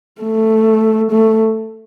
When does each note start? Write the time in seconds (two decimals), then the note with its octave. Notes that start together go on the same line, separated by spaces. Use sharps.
0.21 A3
1.11 A3